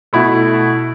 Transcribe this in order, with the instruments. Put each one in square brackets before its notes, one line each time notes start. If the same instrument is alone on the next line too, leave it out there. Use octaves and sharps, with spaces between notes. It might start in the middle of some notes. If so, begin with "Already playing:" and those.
[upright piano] B2 A3 E4 A4